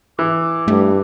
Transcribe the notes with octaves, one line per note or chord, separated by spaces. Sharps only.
E3 D6
G2 A3